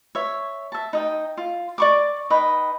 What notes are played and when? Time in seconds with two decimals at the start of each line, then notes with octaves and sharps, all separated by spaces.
0.15 C#5 E5
0.72 E5 A5
0.93 D#4 D#5 G5
1.37 F4
1.78 D5 C#6 D6
2.30 D#4 B4 D#5 G5